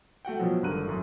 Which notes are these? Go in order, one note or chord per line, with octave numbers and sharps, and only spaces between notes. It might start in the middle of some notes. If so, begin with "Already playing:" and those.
A3 F#4 F#5 G5
B2 F3 F#3
G#1 G2 D3 A#4 F#6 D#7
F#2 A2